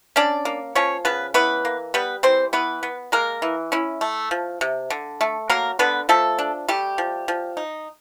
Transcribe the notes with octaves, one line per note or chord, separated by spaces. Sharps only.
C#4 D4 D5
A#3
F3 C#4 C#5
C#3 B3 B4
E3 B3 B4
A#3
G3 B3 B4
E3 C4 C5
E3 B3 B4
B3
G#3 A#3 A#4
E3
C#4 E4
A3
F3
C3
D3
A3
F#3 A#3 A#4
D3 B3 B4
F3 A3 A4
D4
G3 A3 G4
F3
F3
D#4